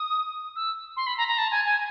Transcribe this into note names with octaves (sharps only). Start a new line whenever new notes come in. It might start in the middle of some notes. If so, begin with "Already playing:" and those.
Already playing: D#6
E6
C6
B5
A#5
A#5
A5
G#5
G#5